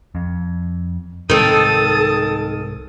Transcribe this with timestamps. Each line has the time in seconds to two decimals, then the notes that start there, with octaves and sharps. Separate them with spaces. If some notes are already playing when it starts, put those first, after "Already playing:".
0.15 F2
1.30 C2 G#2 D#3 C4 A4 A5 D#6